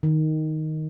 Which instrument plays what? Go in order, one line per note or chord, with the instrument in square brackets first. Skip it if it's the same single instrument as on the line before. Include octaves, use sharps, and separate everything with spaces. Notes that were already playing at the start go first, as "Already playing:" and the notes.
[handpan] D#3